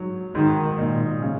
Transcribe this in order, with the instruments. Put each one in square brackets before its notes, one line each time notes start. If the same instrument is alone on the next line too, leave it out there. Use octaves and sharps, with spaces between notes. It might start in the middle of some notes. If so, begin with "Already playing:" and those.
Already playing: [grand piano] G#2 F#3
[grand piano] G#2 [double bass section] D#3
[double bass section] A#2 [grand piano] D#4
[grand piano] C#3